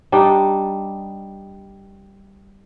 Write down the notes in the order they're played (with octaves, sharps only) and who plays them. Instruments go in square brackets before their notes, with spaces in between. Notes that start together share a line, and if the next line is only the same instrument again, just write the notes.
[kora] G3 D4 D#4